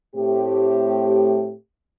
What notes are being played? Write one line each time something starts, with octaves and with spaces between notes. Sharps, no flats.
A2 A3 C4 G4